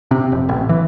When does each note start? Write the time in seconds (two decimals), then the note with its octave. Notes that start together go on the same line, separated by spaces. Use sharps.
0.11 C3
0.32 F1
0.49 A1
0.69 E3